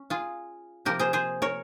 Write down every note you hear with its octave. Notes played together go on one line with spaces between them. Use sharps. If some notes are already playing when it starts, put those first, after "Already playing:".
Already playing: C#4
F4 G#4
C3 F3 A#3 G4 A#4
G#4 C5
G#4 C5
A#4 C#5